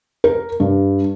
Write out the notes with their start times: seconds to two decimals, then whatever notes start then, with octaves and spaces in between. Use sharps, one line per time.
0.24 A#4
0.60 G2